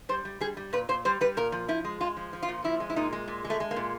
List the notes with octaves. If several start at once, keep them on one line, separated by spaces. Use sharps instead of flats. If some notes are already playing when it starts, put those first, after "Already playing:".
G3 C5
G3
G3 G#4
G3
A#2 B4
A#2 C5
G3 C5
G3 B4
A#2 A#4
F3
F3 E4
G#3
G#3 F4
F3
F3
F4
A#2
F3 E4
G#3
E4
A#2 D#4
G#3
A#2
G#3
A3
G#3
A#3
A#2